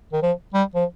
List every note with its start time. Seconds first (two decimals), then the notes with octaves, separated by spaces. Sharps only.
0.13 D#3
0.23 F3
0.54 G3
0.75 F3